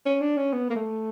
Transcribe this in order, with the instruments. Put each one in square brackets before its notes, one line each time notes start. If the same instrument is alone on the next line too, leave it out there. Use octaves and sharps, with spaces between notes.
[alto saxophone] C#4
D4
C#4
B3
A#3
A3